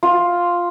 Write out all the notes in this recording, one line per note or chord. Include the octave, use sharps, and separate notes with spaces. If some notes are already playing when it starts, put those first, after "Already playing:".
F4